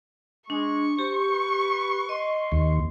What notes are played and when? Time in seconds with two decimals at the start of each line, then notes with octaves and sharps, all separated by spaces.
0.50 G#3 D4 C#6
0.99 G4 C5 C6
1.29 B4
2.09 D#5 C6
2.52 D#2